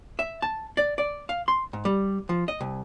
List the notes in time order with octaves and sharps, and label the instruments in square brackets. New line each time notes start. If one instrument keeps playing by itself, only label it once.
[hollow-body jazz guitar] E5
A5
D5
D5
F5
C6
G#2
G3
F3
D#5
C2